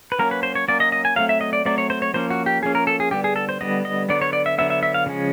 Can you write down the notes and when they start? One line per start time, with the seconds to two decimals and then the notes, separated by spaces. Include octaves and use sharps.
0.12 B4
0.19 F#3 A#3 C#4 A#4
0.31 B4
0.43 C5
0.55 C#5
0.68 F#3 A#3 C#4 D5
0.80 D#5
0.92 D#5
1.05 G#5
1.16 F#3 A3 C4 F5
1.29 E5
1.41 D#5
1.53 D5
1.65 F#3 A3 C4 D5
1.78 C#5
1.90 C5
2.02 C#5
2.14 F3 A#3 C#4 C5
2.30 F#4
2.46 G4
2.62 F3 A#3 C#4 G#4
2.75 A#4
2.87 A4
3.00 G#4
3.11 D3 G3 B3 G4
3.24 G#4
3.36 A4
3.49 C5
3.61 D3 G3 B3 D#5
3.85 D#5
4.09 D3 F#3 B3 D5
4.22 C#5
4.33 D5
4.46 E5
4.58 D3 F#3 B3 E5
4.70 E5
4.83 E5
4.94 F5
5.06 C#3 F3 G#3 C#4